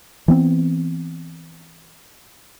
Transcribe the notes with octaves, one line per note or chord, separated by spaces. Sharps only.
E3 B3 C4